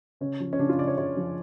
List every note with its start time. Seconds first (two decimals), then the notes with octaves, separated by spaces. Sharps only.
0.21 C#3 C#4
0.40 F3
0.53 C#4
0.59 C#3 D4
0.69 F4
0.78 C#3 D5
0.87 C#5
0.98 C#3 C#5
1.17 F3